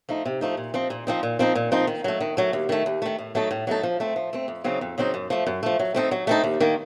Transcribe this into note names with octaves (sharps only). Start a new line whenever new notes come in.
F3 A3 D#4
C3
F3 A3 D#4
A#2
F3 C4 D#4
A#2
F3 C4 D#4
A#2
F3 C4 D#4
A#2
F3 C4 D#4
D#3
F#3 A3
D#3
F#3 A3
D#2
D#3 A3
D#2
D#3 A3
A2
F#3 A3 D#4 A4
A2
F#3 A3 D#4 A4
F3
A3 C4
F3
A3 C4
F2
C#3 F#3 C4 D#4
F2
C#3 F#3 C4 D#4
F#2
F3 A3
F#2
F3 A3
F#3
A3 C4 D#4 A4
F#3
A3 C4 D#4 A4
D#2
D#3 A#3